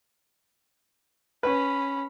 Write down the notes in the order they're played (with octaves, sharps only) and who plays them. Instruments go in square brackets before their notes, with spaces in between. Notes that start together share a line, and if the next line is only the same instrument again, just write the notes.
[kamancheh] C#4 B5 [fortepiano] B4